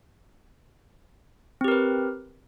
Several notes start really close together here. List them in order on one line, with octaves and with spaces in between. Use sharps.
C4 G4 A#4 B4